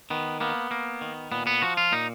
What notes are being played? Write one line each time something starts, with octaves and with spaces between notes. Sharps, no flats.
D#3 B3
A#3 B3
A#3
D#3
A#2 B3
B3
F3 F#4
F4
A#2 D#4